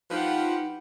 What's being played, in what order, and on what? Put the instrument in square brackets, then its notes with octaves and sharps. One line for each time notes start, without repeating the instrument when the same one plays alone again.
[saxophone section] F3 B4 [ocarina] D#4 [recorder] F4 [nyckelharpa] G4 F#5